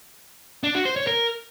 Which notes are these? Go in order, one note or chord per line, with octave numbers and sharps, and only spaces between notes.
D4
F#4
C5
C#5
A#4